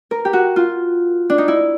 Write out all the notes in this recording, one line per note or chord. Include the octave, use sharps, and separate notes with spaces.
A#4
G4
F#4
F4
D4
D#4
E4